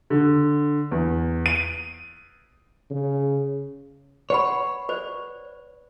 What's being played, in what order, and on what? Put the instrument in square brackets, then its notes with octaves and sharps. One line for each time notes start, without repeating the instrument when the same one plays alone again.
[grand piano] D3
E2
D#7
[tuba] C#3
[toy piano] B4 F#5 B5 [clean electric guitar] C#5
[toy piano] B4 C5 D5